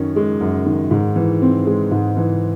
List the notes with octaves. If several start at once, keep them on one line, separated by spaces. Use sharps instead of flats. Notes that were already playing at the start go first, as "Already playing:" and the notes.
Already playing: F#2 D#3 C#4
G#3
F#2
D#3
G#2
E3
C4
G#3
G#2
E3